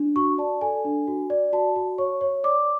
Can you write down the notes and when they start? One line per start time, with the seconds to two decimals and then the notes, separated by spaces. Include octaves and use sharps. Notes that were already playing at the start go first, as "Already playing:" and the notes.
Already playing: D4
0.16 F#4 C#6
0.38 D5 A5
0.61 A4 G#5
0.85 D4
1.07 F#4
1.30 D5
1.53 F#4 A5
1.76 F#4
1.98 C#5 C#6
2.21 C#5
2.44 D5 D6